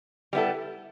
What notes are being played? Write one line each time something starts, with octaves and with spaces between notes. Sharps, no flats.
G3 B3 E4 A4